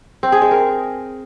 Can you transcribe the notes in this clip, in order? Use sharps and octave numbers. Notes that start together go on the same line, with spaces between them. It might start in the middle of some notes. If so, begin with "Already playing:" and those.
C4
G#4
G#3
A#4